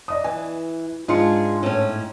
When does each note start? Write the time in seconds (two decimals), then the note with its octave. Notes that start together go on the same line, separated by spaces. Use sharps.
0.08 D5 D#5 D#6
0.24 E3 G#5
1.08 G#2 D4 F4 G#4 C#7
1.63 A2 C#4